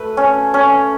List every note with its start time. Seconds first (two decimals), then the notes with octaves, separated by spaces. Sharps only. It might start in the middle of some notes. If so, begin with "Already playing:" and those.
Already playing: A3 B4
0.17 C#4
0.54 C#4